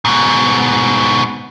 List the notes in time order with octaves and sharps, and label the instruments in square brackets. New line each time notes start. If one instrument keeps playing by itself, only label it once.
[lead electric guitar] G#2 B2